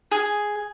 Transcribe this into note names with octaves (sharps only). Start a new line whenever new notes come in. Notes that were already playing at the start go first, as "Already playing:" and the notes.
G#4